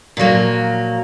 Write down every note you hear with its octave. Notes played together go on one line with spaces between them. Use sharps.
A#2 F3 F#3 A#3